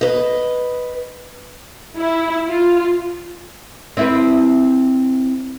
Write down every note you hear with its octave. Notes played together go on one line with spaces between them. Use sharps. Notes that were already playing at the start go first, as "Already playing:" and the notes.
B4 D#5
E4
F4
C4 E4 B4